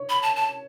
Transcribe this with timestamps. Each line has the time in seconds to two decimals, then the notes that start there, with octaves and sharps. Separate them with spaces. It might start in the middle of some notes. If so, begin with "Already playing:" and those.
Already playing: C#5
0.09 B5
0.22 A5
0.36 A5